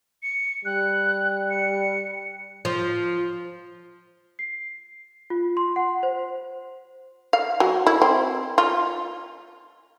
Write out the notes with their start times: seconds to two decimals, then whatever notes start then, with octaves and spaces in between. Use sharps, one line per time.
0.23 C#7
0.65 G3 F#6
1.50 C#7
2.65 F3
4.39 C7
5.30 F4
5.57 C6
5.76 F#5
6.03 C5
7.33 F5
7.60 F#3
7.87 E4
8.02 C4
8.58 F4